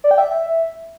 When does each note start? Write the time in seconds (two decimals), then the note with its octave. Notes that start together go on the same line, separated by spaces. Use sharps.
0.04 D5
0.11 G5
0.18 E5